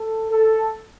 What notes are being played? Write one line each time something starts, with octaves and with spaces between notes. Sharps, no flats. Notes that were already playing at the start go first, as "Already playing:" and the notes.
Already playing: A4
A4